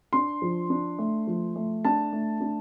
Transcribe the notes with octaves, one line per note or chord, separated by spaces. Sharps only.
D4 C6
F3
D4
A3
F3
A3
D4 A5
A3
D4